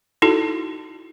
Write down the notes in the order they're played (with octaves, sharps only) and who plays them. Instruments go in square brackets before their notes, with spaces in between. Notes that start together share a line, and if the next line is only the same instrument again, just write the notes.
[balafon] D#4 E4 F#4 A4